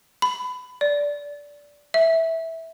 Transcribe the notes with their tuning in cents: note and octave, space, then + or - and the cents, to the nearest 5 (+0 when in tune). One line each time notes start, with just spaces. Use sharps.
B5 +20
D5 -15
E5 -10